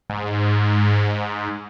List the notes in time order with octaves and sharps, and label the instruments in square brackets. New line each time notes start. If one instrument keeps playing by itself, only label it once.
[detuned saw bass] G#2